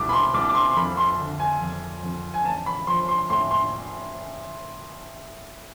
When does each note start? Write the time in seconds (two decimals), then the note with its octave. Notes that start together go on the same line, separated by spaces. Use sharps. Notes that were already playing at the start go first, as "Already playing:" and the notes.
Already playing: C2 B2 D6
0.09 B5
0.13 C6
0.34 C2 D6
0.49 D6
0.55 C6
0.71 C6
0.76 F2 B5
0.97 C6
1.19 D3
1.40 G#5
1.61 F2
2.03 F2
2.34 G#5
2.45 A1 A5
2.66 B5
2.87 F3 C6
3.08 C6
3.30 A2 C6
3.51 C6